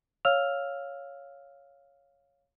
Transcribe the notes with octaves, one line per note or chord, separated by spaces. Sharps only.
C#5 F5 E6 F6 F7